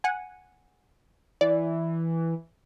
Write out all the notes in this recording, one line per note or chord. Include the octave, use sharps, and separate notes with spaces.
F#5 G#5
E3 D5